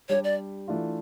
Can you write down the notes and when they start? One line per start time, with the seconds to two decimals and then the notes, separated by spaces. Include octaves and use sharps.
0.09 G3 D4 G4 C#5
0.24 D5
0.68 E3 A3 D4 F4